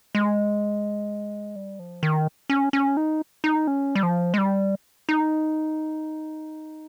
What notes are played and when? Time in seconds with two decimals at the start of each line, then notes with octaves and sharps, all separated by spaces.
0.15 G#3
1.56 G3
1.79 F3
2.03 D#3
2.50 C#4
2.73 C#4
2.97 D#4
3.44 D#4
3.67 C#4
3.95 G3
4.03 F3
4.34 G#3
4.38 G3
5.09 D#4